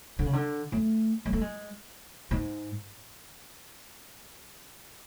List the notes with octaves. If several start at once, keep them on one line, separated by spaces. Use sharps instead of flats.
D3
C#3
D3
A3
G#3
A3
G#3
G#2